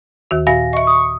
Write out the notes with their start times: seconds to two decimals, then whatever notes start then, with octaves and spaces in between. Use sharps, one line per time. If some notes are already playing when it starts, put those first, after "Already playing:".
0.31 D#2 D#3 F#4
0.47 A#2 F#4 E5 F5 G#5 A#6
0.73 D#5 E5 C#6
0.87 D#6